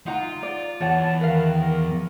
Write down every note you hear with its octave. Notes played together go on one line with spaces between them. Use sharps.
D#4 F4 F#5 A#5
D5
E2 C#5 F#5 A5
D#3 A#4 B4 F5